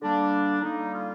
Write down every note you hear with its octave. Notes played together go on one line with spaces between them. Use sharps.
D3 G3 A#3 D4
D3 G3 A#3 D#4
F4